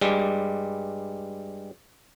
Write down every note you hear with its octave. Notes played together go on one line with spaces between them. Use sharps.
G2 G3 G#3